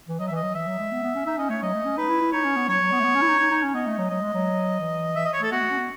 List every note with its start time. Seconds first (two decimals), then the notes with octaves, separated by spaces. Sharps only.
0.08 E3
0.20 F#3 D#5
0.28 E5
0.32 E3 D#5
0.43 F#3
0.55 E3 E5
0.67 F#3
0.79 G#3
0.91 B3
1.03 B3
1.15 C#4
1.26 D#4 E5
1.37 C#4 D#5
1.50 A3 C#5
1.62 F#3 D#5
1.74 A3
1.85 C#4
1.97 D#4 B4
2.09 E4
2.21 E4
2.32 D#4 C#5
2.45 C#4
2.56 B3
2.68 F#3 C#5
2.80 F#3
2.91 B3
3.00 A3
3.04 B3
3.15 C#4
3.22 E4
3.28 D#4
3.39 D#4
3.51 D#4
3.63 C#4
3.74 B3 D#5
3.86 A3
3.98 F#3
4.10 F#3 D#5
4.21 G#3
4.34 F#3
4.80 E3
5.16 E3 E5
5.25 D#5
5.33 C#5
5.40 A3 A4
5.51 B3 F#4
5.61 A3
5.70 C#4
5.78 B3